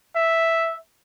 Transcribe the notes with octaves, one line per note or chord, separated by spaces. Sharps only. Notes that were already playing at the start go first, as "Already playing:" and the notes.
E5